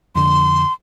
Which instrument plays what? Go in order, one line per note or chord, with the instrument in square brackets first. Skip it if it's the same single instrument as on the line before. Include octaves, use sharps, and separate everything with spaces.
[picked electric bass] F2 D3 [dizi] C6